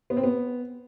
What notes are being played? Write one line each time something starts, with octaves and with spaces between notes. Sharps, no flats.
B3
C4
B3